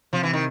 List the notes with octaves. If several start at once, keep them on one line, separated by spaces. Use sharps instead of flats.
C3 F3
E3
D#3